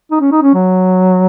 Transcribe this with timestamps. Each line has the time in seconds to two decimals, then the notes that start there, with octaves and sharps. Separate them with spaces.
0.11 D#4
0.21 C#4
0.32 D#4
0.42 C#4
0.54 F#3